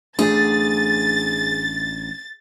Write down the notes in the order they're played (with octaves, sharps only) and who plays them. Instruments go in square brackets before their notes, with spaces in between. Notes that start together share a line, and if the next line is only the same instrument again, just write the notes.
[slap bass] A1 A3 D4 [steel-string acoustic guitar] G#4 [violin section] A6